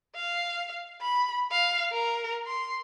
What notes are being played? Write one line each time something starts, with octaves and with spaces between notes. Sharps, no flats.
F5
B5
F5
A#4
C6